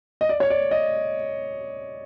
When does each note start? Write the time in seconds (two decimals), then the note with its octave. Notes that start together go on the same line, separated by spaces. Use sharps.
0.21 D#5
0.29 D5
0.40 C#5
0.50 D5
0.71 D#5